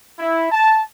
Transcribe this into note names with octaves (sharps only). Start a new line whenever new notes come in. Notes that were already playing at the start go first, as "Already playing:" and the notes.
E4
A5